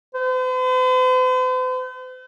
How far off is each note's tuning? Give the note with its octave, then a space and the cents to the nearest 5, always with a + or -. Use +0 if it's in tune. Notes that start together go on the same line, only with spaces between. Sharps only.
C5 -45